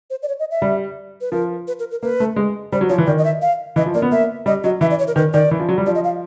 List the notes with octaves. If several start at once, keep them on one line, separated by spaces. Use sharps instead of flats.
C5
D5
C#5
D#5
E5
G3
B4
F3 A#4
B4
A#4
A#4
A#3 B4
A3
G#3
G3 C5
F#3
F3 C#5
E3
D#3 D5
D#5
E5
F5
E3 D#5
F3
A#3 D5
B3
A#3 E5
G3 D#5
F#3 D#5
E3 E5
D5
C#5
A#4
D#3 B4
D#3 D5
E3
F3
F#3
G3
F3 D5
D#5
F5